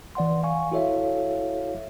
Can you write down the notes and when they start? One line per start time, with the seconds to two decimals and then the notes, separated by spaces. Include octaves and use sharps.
0.15 E3 D5 F#5 C6
0.43 F5 G#5 C#6
0.71 E4 F#4 A4 C#5 E5 F5